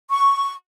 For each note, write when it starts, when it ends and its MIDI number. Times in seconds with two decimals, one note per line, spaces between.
0.10 0.53 85